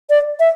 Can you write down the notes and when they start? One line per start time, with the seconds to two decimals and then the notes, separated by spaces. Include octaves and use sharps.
0.10 D5
0.40 E5